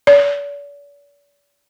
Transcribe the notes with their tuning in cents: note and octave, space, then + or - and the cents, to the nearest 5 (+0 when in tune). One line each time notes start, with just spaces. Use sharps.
D5 -45